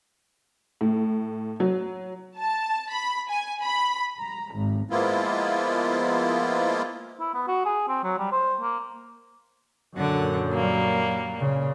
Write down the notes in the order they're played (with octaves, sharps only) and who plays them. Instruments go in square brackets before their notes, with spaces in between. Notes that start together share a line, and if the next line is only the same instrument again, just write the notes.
[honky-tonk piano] A2
F#3
[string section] A5
B5
G#5
B5
A#5
G#1
[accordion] F3 G#3 A#3 B3 E4 F4
[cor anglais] E4
B3
F#4
G#4
C4
F#3
G3
C5
A#3
[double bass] F#2 A#2 [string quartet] D3 F#5
[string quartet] F#3 G3 A#3
[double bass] A#2 C#3